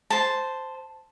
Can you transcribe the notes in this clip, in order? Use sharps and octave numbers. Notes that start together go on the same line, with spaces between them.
C5 A5